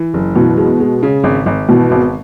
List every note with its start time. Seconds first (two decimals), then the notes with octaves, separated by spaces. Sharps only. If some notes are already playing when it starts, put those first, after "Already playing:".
Already playing: E3
0.14 F#1
0.35 B2 E3
0.57 G#3
0.80 G#3
1.03 C#3
1.24 G#1
1.46 G#1
1.69 B2 E3
1.91 G#1